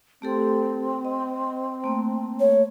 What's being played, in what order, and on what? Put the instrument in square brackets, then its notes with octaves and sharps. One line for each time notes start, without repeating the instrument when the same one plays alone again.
[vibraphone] A3 G4 A4 [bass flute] C4
[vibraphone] D#5
A3 A#3
[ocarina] C#5